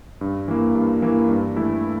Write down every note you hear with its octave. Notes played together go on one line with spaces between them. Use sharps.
G2
E3 A#3
G2
E3 A#3
G2
E3 A3 E4